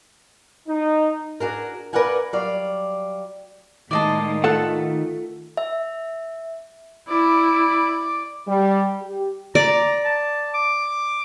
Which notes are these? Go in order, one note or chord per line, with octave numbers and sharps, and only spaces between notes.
D#4
D4 F#4 G#4 A#4
A#4 B4 D5 F5 F#5 G#5
F#3 G3 D5 F5
A2 D#3 G#3 A#3 D5 D#5 A5
A3 F4 A4 F#5
E5
E4 D5
G3
G4
D5 A#5
A5
D6